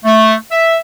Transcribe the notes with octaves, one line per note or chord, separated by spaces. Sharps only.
A3
E5